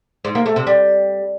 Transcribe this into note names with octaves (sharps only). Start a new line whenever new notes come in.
G#2
A#3
A3
C3
G3